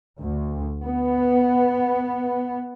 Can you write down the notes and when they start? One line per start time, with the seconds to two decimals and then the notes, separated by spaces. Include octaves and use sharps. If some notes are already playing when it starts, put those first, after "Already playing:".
0.20 D2
0.84 B3